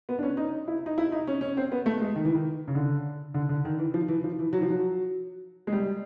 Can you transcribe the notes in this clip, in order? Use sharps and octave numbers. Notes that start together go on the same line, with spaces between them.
B3
D4
C#4
D#4
E4
D#4
E4
D#4
C#4
C#4
C4
B3
A3
G#3
D#3
E3
D#3
C#3
D3
D3
D3
D#3
E3
F3
E3
F3
E3
F#3
F3
F#3
G#3
G3